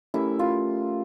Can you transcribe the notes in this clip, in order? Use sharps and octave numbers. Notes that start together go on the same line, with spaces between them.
A3 C#4 E4 G4 A#4
F4